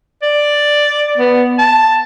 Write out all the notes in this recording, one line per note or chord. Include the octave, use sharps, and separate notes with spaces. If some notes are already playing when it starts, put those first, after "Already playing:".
D5
B3
A5